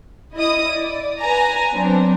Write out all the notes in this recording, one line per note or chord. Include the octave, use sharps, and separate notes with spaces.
E4 D#5 D#6
D5
B4 G#5 A#5
F#3 B3 C4 D4